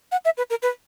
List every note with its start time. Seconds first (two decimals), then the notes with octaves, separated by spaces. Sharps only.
0.12 F#5
0.25 E5
0.37 B4
0.50 A#4
0.62 B4